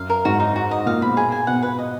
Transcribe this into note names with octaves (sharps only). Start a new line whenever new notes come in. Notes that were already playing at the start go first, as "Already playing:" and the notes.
Already playing: F#2 F5
A#4
G#2 F#4
D#4
F#4
D#5
A#2 F5
B2 B5
G#4
G#5
B2 F#5
B4
D#5